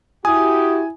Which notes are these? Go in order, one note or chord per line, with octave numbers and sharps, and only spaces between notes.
E4 F#4 G4 G#5 D#6